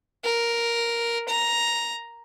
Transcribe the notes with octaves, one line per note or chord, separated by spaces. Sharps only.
A#4
A#5